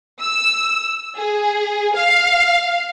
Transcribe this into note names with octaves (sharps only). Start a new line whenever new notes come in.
E6
G#4
F5